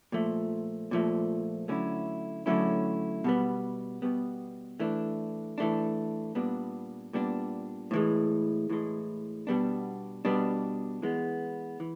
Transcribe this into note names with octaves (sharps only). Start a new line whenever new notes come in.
A#2 F3 A3
A#2 F3 A3
D3 F#3 A3 C#4 E4
D3 F#3 A3 C#4 E4
B2 G3 B3
B2 G3 B3
E3 A3 D4
E3 A3 D4
A#2 G3 B3 D4
A#2 G3 B3 D4
A2 E3 G#3
A2 E3 G#3
B2 G3 B3 D4
B2 G3 B3 D4
E3 G#3 B3
E3